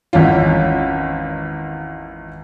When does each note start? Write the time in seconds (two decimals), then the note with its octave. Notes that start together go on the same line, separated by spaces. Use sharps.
0.13 G#1 E2 C#4 F4